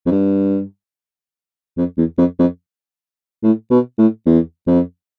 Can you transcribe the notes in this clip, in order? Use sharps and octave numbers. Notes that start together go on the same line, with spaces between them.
F2
G2
F2
E2
F2
F2
A2
B2
A2
E2
F2